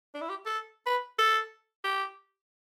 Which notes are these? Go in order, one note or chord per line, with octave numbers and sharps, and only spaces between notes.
D4
E4
G4
A4
B4
A4
G4